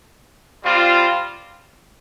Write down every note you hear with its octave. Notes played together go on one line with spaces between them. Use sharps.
G3 C4 F4